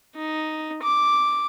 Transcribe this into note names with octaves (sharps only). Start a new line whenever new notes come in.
D#4
D6